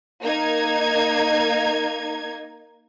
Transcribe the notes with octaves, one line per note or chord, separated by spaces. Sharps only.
A#3 D#4 G#6